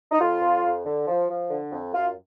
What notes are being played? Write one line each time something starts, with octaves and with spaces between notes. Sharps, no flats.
D#4
F2 F4
F2
F2
D3
F3
F3
D3
F2
F#2 F4